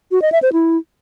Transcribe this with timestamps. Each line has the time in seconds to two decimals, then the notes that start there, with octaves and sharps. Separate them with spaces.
0.12 F#4
0.22 D#5
0.32 E5
0.42 C5
0.53 E4